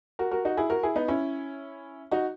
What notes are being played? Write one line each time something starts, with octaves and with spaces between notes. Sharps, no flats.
F#4 A#4
F#4 A#4
D#4 F#4
E4 G#4
F#4 A#4
E4 G#4
B3 D#4
C#4 E4
D#4 F#4